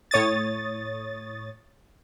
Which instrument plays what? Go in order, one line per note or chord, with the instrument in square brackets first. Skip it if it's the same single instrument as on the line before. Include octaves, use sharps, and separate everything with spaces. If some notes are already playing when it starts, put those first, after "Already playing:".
[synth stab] A2 C#5 D#6 A6